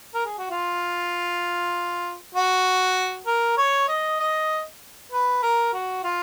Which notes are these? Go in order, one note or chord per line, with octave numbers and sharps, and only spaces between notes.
A#4
G#4
F#4
F4
F#4
A#4
C#5
D#5
D#5
B4
A#4
F#4
F4